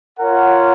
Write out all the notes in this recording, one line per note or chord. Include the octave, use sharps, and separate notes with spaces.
F4 A#4 C#5 F#5